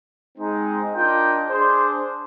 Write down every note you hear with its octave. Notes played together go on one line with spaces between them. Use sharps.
G#3 C4 D#4
D4 F4 A#4 D#5 G5
D4 G#4 C5